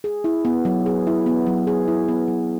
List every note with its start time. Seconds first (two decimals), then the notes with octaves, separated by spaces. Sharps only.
0.04 G#4
0.24 E4
0.45 B3
0.65 F#3
0.86 G#4
1.07 E4
1.26 B3
1.47 F#3
1.67 G#4
1.88 E4
2.08 B3
2.28 F#3